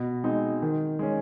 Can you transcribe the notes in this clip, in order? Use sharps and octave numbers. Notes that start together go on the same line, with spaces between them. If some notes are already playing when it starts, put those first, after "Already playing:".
Already playing: B2
G#3 C4 D#4
D#3
G#3 C#4